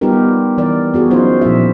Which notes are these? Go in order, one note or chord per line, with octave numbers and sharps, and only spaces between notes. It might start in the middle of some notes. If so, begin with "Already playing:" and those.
G3 B3 D#4 F4 G4 A#4
E3 A#4 D5
B3 F#4 G#4
F#3 C#4 D#4 F4 F#4 C5
A#2 F3 E4 E5